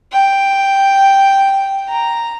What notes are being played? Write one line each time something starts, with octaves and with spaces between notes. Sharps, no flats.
G5
A#5